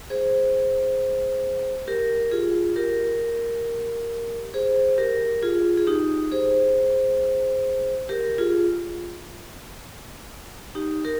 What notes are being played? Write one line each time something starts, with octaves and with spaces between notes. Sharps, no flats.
G#4 C5
G4 A#4
F4 G#4
G4 A#4
G#4 C5
G4 A#4
F4 G#4
G#4
D#4 G4
G#4 C5
G4 A#4
F4 G#4
D#4 G4
G4 A#4